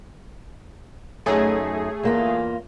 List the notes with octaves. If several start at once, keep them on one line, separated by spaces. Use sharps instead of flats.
F#2 A3 D#4 G#4
E2 A#3 F4